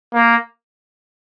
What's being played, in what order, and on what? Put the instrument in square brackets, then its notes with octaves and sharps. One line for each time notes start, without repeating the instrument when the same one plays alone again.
[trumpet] A#3